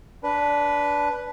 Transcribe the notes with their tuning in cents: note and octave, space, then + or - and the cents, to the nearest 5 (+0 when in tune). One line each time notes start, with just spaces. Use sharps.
D4 -15 B4 +0